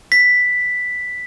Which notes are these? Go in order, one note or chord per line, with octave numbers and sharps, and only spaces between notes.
B6